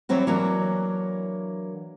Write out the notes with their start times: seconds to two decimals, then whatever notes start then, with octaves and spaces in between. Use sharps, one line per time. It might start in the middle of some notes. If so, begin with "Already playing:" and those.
0.09 E3 F#3 G3 C4 F#4
0.27 E3 F#3 A#3 D4